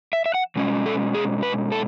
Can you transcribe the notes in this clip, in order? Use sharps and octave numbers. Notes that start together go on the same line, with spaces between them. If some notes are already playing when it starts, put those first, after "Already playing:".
E5
E5
F#5
B2 G#3 C#4
A4
G#4
B4
A4